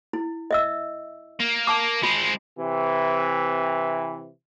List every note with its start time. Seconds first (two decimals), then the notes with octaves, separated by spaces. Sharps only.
0.13 E4
0.51 D#5 E5 E6
1.40 A#3
1.67 A5 D6
2.03 G#3 C4 F4
2.59 C3 E3